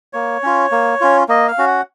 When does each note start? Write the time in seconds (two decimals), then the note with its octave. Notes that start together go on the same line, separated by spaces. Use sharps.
0.13 A#3 C#5
0.43 C#4 F4
0.72 A#3
1.01 C#4 F4
1.29 A#3 D#5
1.48 F5
1.58 C#4 F#4
1.67 F#5